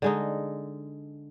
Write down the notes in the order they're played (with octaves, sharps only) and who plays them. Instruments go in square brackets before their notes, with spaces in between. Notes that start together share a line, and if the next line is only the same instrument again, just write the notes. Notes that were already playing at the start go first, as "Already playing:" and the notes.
[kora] D3 G#3 D#4